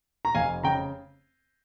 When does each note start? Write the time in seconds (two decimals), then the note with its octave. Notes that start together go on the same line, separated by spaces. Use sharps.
0.25 A#5
0.35 F1 F5 G#5
0.63 C#3 G5 A#5